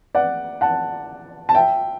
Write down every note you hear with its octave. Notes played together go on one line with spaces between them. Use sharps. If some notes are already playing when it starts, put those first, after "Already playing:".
D5 F#5
F#5 A5
A5
E5 G5